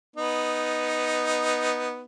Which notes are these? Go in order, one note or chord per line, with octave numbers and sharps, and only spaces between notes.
B3 D#4